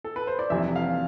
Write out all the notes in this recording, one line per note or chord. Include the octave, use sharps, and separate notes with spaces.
A4
B4
C5
D5
F1 F2 C3 E3 G3 E5
F5